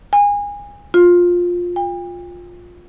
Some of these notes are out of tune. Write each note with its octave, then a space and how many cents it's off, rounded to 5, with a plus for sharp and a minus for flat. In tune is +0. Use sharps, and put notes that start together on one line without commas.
G#5 -25
F4 +15
G5 +40